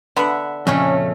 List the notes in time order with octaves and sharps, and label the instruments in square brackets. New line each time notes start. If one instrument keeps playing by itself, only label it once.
[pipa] D3 B3 [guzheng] E5 F#5
[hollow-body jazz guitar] F2 [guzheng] A#2 C#3 A3 [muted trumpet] C#4